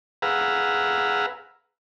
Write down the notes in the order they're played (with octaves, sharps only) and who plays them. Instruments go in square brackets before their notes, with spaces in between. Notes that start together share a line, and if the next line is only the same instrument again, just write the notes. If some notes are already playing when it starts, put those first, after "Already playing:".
[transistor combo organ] G#4 B4 F5 F#5 A#5 E6